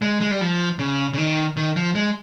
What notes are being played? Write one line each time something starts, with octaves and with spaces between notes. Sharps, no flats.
G#3
G#3
G3
F3
C#3
C#3
D#3
D#3
F3
G#3